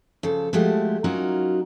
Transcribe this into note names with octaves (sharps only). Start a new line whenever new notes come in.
C#3 F3 A4
F3 G#3 A3 F#4 G4
F#3 C#4 D#4 F4 F#4 A#4